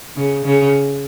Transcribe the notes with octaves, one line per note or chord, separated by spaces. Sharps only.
C#3
C#3